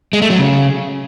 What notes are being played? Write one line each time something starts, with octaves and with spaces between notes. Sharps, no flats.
G#3
A3
F#3
C#3